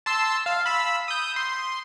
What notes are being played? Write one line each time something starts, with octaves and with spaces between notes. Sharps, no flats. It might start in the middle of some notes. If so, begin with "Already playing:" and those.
A5 C6 E6
F5
B5 E6
D#6 G6
C6